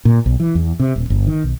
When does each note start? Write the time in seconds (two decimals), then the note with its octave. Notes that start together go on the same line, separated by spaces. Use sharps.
0.05 A#2
0.26 B1
0.40 E3
0.55 E2
0.80 C3
0.96 D#1
1.10 G1
1.27 D#3
1.44 B1